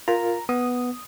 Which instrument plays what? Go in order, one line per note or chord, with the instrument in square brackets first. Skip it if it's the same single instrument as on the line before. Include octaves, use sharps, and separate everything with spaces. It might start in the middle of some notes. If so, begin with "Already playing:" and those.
[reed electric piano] F4 A#4 [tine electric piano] A#5
[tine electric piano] B3 [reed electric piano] D#6